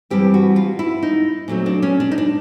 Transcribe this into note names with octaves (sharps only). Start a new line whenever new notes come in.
G2 E3 G3 C4 G4
F#4
F4
E4
D#4
A#2 F#3 A3 C4
D4
C#4
D4
D#4
D4